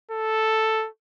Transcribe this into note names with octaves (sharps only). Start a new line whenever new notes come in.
A4